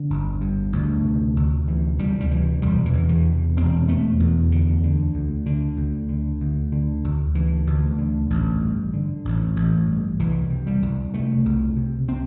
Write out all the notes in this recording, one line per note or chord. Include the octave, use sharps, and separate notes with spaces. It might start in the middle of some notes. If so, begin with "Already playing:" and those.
Already playing: D3
G1
G2
D2
C3
D2
C3 E3
D2 G3
G3
C3 E3
E1 G3
E3
E2
E3
C3
E1 C4
E1 A3
E2
D2 D3
D3
D2
D3
D2
D3
D2
D3
D2
D3 E3
D2
D3
A1
G2
D3
A1
A1
G2
C2 E3
C3
G3
C2
C3 A3
C2
C3
C4